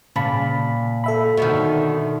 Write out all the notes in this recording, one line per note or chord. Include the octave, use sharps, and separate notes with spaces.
A#2 C#3 A5 B5
A4 E5 B5
B2 D3 D#3